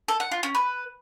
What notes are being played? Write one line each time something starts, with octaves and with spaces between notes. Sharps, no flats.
A4
F#5
F4
C#4
B4